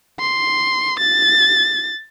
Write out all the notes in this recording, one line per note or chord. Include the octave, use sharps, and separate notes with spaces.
C6
A6